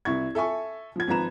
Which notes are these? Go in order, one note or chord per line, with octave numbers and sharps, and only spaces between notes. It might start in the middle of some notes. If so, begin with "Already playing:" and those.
C2 E4 C#6 G#6
A4 E5 G#5 C#6
F3 G#6
G#1 F3 B4 A#5 E7